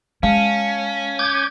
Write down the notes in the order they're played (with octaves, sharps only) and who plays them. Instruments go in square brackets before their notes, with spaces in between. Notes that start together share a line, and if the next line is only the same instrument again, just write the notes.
[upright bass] G#3 [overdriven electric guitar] C#4 [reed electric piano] F5 A5
[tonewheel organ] D6 G6 G#6